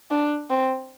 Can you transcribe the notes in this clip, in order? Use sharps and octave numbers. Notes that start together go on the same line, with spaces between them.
D4
C4